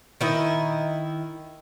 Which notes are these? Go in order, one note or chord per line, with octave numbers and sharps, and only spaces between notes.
D#3 E4 D#5